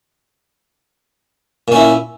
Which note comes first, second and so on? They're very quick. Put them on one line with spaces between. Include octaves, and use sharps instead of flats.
A#2 C#4 E4